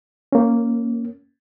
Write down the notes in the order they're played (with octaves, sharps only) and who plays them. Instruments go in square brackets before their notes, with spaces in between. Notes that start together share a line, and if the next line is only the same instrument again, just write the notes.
[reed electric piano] A#3 C#4